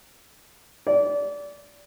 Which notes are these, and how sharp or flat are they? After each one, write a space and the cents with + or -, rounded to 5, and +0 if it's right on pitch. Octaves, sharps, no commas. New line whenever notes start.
D5 -25